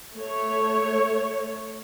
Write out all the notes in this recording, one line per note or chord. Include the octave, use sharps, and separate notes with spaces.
A3 C#5